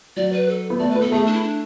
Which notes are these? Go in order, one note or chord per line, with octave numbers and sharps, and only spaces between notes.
F#3 D5
B4
A4
B3
A3 D5
B4
B3
A4
A3 G#4
D4
E4
D4